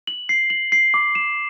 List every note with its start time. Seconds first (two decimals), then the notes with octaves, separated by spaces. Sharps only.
0.07 F#7
0.29 C7
0.50 F#7
0.72 C7
0.94 D6
1.15 E7